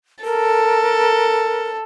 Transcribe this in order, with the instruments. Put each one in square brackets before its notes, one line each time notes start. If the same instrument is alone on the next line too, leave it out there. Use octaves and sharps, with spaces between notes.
[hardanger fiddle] A4 [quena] A#4